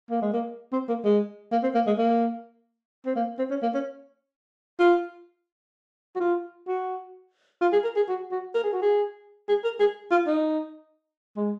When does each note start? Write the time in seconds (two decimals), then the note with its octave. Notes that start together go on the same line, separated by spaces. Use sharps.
0.10 A#3
0.22 G#3
0.33 A#3
0.73 C4
0.88 A#3
1.04 G#3
1.52 A#3
1.63 C4
1.75 A#3
1.87 G#3
1.98 A#3
3.06 C4
3.16 A#3
3.39 C4
3.51 C#4
3.62 A#3
3.74 C#4
4.79 F4
6.15 F#4
6.20 F4
6.68 F#4
7.61 F4
7.73 G#4
7.84 A#4
7.96 G#4
8.08 F#4
8.31 F#4
8.55 A#4
8.63 G#4
8.73 F#4
8.82 G#4
9.49 G#4
9.64 A#4
9.80 G#4
10.11 F4
10.27 D#4
11.37 G#3